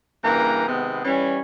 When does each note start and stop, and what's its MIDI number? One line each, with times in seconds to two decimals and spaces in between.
0.24 0.63 43
0.24 0.63 49
0.24 0.63 52
0.24 0.63 58
0.24 0.63 82
0.68 1.01 48
0.68 1.01 51
0.68 1.01 56
0.68 1.01 59
1.04 1.40 52
1.04 1.40 55
1.04 1.40 61